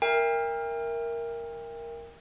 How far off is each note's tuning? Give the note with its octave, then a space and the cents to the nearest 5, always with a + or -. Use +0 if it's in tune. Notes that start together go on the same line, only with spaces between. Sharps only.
A#4 +0 E5 +0 G5 +40